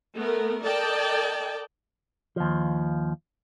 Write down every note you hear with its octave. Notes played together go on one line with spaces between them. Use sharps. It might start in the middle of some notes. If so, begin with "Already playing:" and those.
A3 B3 A#4
A4 A#4 D5 D#5 G5 A5
D#2 F3